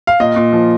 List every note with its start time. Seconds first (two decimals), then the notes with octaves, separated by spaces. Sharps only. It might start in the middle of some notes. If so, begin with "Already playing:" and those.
0.07 F5
0.20 A#2 D#5
0.36 A#2
0.53 F3